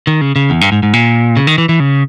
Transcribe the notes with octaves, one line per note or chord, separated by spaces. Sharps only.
D#3
C#3
C#3
E2
G2
G#2
G#2
A#2
C#3
D#3
E3
E3
C#3